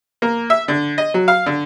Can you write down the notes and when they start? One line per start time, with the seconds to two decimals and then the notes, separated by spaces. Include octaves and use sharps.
0.22 A#3
0.50 E5
0.68 D3
0.98 D#5
1.14 F#3
1.28 F5
1.46 D3